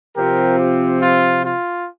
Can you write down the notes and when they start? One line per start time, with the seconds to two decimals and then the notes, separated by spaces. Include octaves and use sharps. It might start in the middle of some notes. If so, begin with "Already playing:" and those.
0.16 C3 F3 C4 F4 G4 A#4
0.59 G4
1.02 F4
1.45 F4